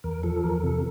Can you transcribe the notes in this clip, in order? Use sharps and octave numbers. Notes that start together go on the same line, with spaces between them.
E2 A#4
F3 A4
E2 A#4
C3 A4